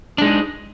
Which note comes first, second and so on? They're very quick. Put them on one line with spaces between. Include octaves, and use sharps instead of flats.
D4 G#3 D#4